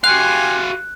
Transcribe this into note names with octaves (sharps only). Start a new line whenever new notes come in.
F#4 G4 F5 G#5 C6 F#6